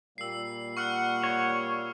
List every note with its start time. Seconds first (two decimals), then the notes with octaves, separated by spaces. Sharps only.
0.18 A#2 G3 A#3 E6 C7
0.77 F#5 C#6 F6 C#7
1.24 C#5